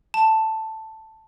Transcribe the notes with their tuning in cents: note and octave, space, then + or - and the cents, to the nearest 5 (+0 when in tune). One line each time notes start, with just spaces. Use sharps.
A5 +5